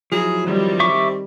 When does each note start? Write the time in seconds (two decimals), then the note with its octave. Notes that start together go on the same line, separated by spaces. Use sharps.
0.12 F3 F#3 E4 G#4
0.46 D#3 G3 C4
0.80 E5 C#6 D6